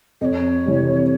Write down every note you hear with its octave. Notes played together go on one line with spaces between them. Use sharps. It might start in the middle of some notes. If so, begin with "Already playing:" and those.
F2 C#5 D#5
C3 E3 G3